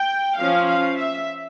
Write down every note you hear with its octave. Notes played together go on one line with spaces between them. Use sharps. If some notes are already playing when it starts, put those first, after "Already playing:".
Already playing: G5
F3 C#4 F5
F5
E5